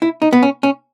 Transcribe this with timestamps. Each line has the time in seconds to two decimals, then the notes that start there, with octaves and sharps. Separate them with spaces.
0.02 E4
0.22 D#4
0.33 B3
0.43 C#4
0.63 C#4